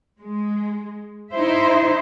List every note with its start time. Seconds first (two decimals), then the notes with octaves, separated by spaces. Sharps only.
0.19 G#3
1.33 D#4 E4 C5 E5